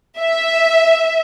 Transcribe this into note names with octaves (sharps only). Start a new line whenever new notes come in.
E5